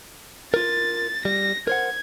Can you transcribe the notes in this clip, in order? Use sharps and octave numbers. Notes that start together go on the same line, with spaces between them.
F4 A#4 A6
G3 A#6
A#4 C5 F#5 G#6